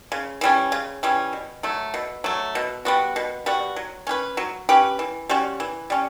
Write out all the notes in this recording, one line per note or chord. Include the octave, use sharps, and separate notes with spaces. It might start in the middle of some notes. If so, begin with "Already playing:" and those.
C#3
E3 G3 C#4
C#3
E3 G3 C#4
B2
F#3 A3
B2
F#3 A3
B2
G3 B3 F#4
B2
G3 B3 F#4
F#3
C#4 G4 B4
F#3
C#4 G4 B4
E3
G3 C#4 F#4
E3
G3 C#4